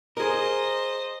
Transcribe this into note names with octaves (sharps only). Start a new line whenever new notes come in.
G#4 A#4 C5 D#5